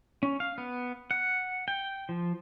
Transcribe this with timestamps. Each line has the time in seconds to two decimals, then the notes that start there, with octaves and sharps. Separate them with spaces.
0.23 C#4
0.40 F5
0.58 B3
1.11 F#5
1.68 G5
2.09 F3